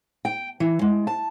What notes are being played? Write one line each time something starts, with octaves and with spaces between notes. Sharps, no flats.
G5
E3
G#3
A5